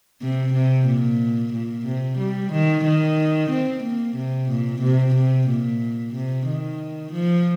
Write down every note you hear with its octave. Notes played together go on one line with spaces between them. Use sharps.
C3
C3
A#2
A#2
C3
G3
D#3
D#3
C4
A#3
C3
A#2
C3
C3
A#2
C3
D#3
F3